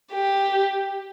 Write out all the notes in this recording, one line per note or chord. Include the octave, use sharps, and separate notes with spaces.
G4